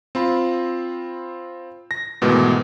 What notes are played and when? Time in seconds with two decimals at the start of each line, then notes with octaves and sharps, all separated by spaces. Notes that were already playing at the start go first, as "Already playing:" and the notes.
0.15 C4 F4 B5
1.91 A#6
2.22 G#2 B2 D#3 E3 A3 B3